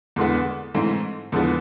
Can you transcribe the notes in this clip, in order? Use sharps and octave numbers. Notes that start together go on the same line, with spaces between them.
E2 D3 G#3 B3
G#2 E3 A3 C4
E2 D3 F3 G#3 B3